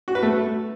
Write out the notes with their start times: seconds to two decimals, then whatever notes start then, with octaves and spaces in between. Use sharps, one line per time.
0.08 F#4
0.15 B4
0.23 A3